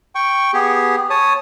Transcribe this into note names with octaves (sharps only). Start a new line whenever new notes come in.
G5 C#6
B3 G4 G#4
C#5 A5 D#6